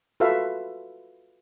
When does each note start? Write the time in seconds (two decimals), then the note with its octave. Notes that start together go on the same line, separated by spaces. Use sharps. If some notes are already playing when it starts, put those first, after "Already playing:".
0.20 F4 F#4 A4 B4 E5 F5